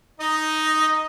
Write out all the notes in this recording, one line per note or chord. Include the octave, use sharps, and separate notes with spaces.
D#4 D#5